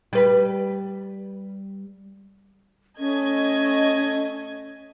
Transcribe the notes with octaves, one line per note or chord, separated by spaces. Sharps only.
G3 B4
A3 C#4 D#5 G#6